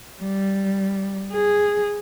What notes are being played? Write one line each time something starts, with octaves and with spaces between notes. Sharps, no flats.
G3
G#4